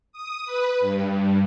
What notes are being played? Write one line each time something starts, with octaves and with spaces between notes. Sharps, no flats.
D#6
B4
G2